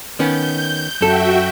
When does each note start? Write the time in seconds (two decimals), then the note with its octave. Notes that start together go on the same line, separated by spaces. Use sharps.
0.19 D#3 B3 C#4 G6
1.01 F#2 F#4 A4 E5 G5